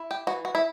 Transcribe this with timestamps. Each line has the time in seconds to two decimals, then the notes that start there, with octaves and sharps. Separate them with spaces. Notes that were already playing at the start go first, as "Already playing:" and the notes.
Already playing: E4
0.11 G4
0.27 E3 F#4
0.45 F#4
0.55 E4